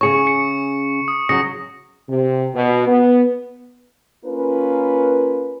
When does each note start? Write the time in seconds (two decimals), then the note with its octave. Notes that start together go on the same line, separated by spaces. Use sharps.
0.01 C#3 G#4 C#5 C#6 C#7
0.27 C#7
1.08 D#6
1.29 C#3 F#3 D#6 A#6 C#7
2.09 C3
2.54 B2
2.86 B3
4.25 A#3 C#4 F4 A#4 B4